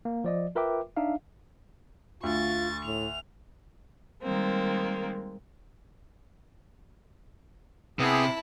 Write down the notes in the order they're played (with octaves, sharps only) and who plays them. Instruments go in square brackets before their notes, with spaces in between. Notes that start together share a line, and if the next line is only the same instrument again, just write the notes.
[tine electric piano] A#3
F3 D5 D#5
F4 A#4 B4 E5 G5 D6
D4 D#4 E5 F5
[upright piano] D2 [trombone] F4 [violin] C#6 A6
[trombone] A2 [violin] F7
[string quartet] D#3 G3 G#3 A#3 C4
[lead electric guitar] C3 [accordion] B3 G#4 [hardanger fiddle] E4 A5